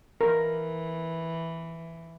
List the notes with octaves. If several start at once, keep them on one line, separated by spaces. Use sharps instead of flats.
E3 A#4